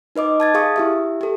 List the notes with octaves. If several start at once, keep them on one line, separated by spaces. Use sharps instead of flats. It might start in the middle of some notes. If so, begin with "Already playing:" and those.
D#4 B4 D#5 D6
A5 G#6 A6
G#4 F5 C#6 D#6
E4 G4 E5
G4 A4